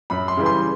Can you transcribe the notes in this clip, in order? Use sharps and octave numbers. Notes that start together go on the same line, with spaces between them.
F#2 B5
C6
C#3 E3 G3
C6